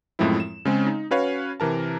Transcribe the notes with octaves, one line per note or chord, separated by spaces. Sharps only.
F#2 A2 F3 G#3 C4 E4
E7
C#3 G#3 C4 C#4
D#4
C#4 F#4 B4 C#5 F5
C3 E3 A#4 A5